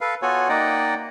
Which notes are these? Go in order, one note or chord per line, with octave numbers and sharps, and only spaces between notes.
A4 B4 F5
B3 F4 F#4 A4 C#5 G#5
A#3 D#4 D5 D#5 F#5 G5